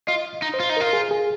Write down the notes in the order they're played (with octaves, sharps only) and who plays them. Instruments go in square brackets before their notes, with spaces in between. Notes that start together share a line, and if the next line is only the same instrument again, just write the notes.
[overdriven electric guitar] F4 [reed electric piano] D#5
[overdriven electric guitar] D#4
[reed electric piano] C5
[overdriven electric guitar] F4
D#4
[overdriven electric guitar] F4 [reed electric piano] A#4
[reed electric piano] G#4
G#4